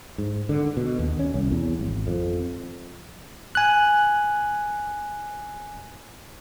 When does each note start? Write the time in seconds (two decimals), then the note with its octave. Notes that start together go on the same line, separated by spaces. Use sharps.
0.18 G#2
0.49 D3
0.77 B2
0.99 D#2
1.19 C#4
1.34 C2
1.51 E2
1.79 G#1
2.07 F2
3.55 G#5 F#6